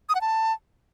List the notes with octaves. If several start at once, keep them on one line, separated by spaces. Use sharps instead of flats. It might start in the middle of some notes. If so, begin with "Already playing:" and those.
D#6
F#5
A5